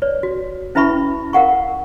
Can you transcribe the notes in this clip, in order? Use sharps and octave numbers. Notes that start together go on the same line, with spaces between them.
B4 C#5 D5
F#4
C#4 E4 B4 E5 B5 C#6
A#4 F5 F#5 C#6